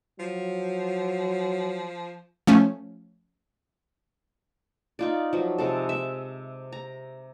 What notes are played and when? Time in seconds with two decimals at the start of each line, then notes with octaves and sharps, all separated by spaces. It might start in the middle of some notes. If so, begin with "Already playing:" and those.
0.19 F3 F#3
2.47 F3 A3 C#4
4.99 D#4 F4 D5
5.33 F3 F#3
5.58 C3 G#3 A4
5.89 E5
6.72 A#5